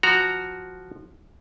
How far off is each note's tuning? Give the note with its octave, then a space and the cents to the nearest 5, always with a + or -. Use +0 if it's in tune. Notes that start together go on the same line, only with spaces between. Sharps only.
F3 +0 F#4 +0 A#5 +0